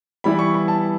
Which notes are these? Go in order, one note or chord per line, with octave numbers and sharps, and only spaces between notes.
E3 G3 B3 E4 B5
C#6
B5
A5